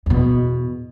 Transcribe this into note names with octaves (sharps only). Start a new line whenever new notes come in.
E2 B2